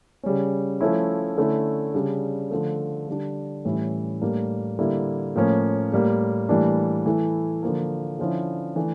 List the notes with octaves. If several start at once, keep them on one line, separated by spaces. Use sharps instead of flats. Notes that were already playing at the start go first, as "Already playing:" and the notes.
C#3 G3 C#4
F3 A3 C#4 E4
D3 A3 C#4 E4
C#3 G3 D4
D3 F3 A3
D3 G3 D4
A2 E3 G3 C#4 E4
A2 G3 A#3 D4
D3 G3 A#3 E4
A2 F3 A#3 C#4
A2 G3 A#3
A2 E3 G3 A#3 D4
E3 A3 E4
D3 F3 A#3
D3 F3 C#4 E4
E3 A3 D4